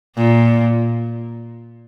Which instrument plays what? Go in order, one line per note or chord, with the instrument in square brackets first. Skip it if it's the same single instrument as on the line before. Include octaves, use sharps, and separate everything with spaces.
[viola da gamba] A#2